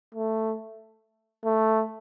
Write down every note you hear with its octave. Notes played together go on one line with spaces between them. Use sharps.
A3
A3